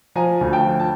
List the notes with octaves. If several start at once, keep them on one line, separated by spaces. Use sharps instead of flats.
F3 G#5 A#5
D2
G5 A5
F3
A5